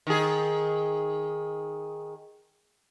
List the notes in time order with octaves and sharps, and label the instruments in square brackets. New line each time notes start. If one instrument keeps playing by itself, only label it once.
[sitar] D#3 G#4